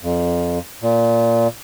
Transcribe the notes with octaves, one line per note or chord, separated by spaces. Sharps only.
F2
A#2